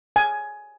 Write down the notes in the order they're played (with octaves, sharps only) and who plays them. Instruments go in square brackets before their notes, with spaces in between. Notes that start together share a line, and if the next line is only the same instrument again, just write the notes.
[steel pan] G#5